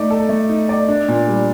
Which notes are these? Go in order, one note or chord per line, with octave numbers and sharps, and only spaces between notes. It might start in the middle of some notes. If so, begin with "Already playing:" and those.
Already playing: A3 D#4 D5
A4
A3
D#4
D5
D4
A#2
G3